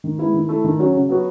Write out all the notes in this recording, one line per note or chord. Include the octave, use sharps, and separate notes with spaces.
D#3
G#3 B3 E4
D#3
A3 E4
D#3
F#3 C#4 F#4
C#3
F#3 B3 F#4